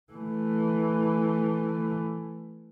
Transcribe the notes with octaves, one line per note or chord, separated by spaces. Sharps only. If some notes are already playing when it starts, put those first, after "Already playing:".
E3 A3